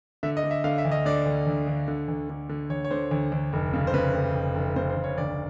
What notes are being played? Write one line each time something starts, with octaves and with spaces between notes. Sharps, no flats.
D3 E5
D#5
D3
E5
D3 F5
E5
D2
D#5
D3 D5
D2
D2
D2
D3
D2
D3
D3
D2 C#5
C#5
D3 C5
D2
D2
F1
C#3
C5
C#3 B4
F1
F1
F1
C#3 C5
C5
F1
C#5
D2 D5